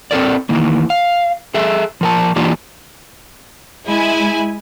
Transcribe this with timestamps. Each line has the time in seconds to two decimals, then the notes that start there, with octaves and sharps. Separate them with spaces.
0.11 C4 A4 A#4 D5
0.49 D#3 E3 A#3
0.90 F5
1.54 G#4 A4 E5
2.01 F3 A#4 A5
2.36 E3 A#3 D4 D#4 F4 G4
3.85 G#3 E4 G#5